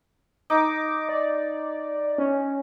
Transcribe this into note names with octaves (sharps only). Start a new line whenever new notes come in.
D#4 D6
D5
C#4